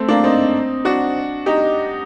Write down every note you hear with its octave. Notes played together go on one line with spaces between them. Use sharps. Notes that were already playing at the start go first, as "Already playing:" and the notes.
Already playing: A3 C4
A#3 D4
C4 D#4
D4 F#4
D#4 G4